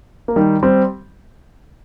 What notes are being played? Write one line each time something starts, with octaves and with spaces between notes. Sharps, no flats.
A#3
D#3 G3
G3 C4